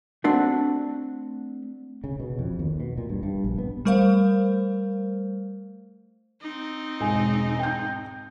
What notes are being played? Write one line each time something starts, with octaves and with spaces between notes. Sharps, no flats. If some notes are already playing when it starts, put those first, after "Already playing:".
A3 C4 D4 F#4
C#3
B2
F2
D#2
B2
A#2
G2
G2
A#1
B3
G3 A3 A#4 C5 F5
C4 D#4
E1 G#2 G#5
G5 G6